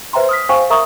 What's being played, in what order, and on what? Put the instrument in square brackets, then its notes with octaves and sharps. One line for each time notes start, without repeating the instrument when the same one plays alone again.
[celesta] B4 C5 E5 G5 A#5 C6
D#6 F6 B6
C5 F5 G5 G#5 C#6
A#4 E5 A#5 C#6 D#6